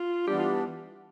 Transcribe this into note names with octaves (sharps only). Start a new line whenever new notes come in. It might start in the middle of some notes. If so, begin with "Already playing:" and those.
Already playing: F4
E3 G3 B3 D4 G4
F4